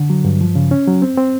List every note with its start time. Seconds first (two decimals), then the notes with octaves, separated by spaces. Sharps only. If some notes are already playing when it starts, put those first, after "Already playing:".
Already playing: D3
0.10 F#3
0.24 G2
0.41 F3
0.55 C#3
0.71 C#4
0.87 F#3
1.02 C4
1.17 C4